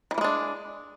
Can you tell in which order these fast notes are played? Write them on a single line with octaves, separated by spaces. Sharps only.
D#3 E3 A#3 G#3 D4